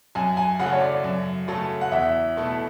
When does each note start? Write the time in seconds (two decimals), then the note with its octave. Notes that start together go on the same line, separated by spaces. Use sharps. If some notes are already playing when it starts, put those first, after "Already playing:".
0.15 F#2 G#5
0.37 G#5
0.59 C#3 F#3 A3 F#5
0.73 C#5
0.81 D5
1.04 F#2
1.48 C#3 F#3 A3
1.81 F#5
1.92 E2 E5
2.36 B2 A3 E4